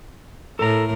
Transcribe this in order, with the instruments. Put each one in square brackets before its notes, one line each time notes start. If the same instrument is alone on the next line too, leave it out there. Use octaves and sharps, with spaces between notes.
[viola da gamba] A2 A#4 [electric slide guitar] A4 A#5